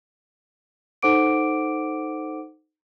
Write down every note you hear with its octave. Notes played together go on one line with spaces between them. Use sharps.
D#4 A4 C5 F#5 D6 D7